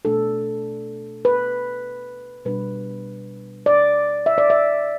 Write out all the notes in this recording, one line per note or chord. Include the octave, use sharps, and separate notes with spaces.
B2 A3 D4 A4
B4
B2 G3 B3 D4 B4
D5
E5
D5
E5